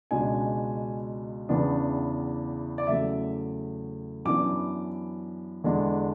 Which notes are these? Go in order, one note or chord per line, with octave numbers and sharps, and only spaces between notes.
C#2 B2 G#3 D4 G#5
E2 C#3 E3 B3 D4
D5
E2 C#3 F#3 A3 E5
F#2 E3 B3 D4 D6
E2 D3 G#3 D4